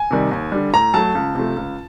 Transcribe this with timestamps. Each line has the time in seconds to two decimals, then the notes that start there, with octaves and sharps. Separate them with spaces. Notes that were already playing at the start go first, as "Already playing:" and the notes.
Already playing: G#5
0.11 C3 D#3 G3
0.31 D#2
0.52 D3 G3
0.73 A2 A#5
0.94 F#3 A3 A5
1.15 C#2
1.35 C3 F3 A3
1.56 C#2